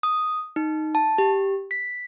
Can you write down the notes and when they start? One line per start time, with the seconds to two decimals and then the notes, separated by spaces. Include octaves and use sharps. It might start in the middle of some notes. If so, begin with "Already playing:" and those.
0.03 D#6
0.56 D#4
0.95 A5
1.18 G4
1.71 B6